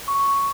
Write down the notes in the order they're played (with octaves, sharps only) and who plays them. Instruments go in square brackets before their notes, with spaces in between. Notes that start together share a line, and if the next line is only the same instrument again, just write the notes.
[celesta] C#6